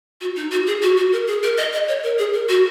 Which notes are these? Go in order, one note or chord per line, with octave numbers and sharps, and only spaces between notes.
F#4
D#4
F#4
G#4
F#4
F#4
A#4
G#4
A#4
D#5
D#5
C#5
A#4
G#4
A#4
F#4